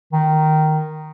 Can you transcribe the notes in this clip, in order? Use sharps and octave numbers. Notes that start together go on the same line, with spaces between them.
D#3